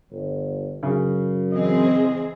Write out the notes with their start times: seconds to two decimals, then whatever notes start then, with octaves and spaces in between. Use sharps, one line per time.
0.12 G1
0.83 F#2 C#3
1.52 E3 C4 G#4 D#5